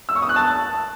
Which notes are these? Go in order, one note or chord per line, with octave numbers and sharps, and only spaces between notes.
E6
C#6
D#6
F#6
A5